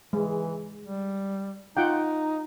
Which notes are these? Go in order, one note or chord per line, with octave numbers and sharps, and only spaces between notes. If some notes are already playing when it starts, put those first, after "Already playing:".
E3 G#3
G3
D#4 F4 F#5 G5